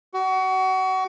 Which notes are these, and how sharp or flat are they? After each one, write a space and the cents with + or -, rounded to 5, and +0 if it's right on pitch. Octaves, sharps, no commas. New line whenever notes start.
F#4 +25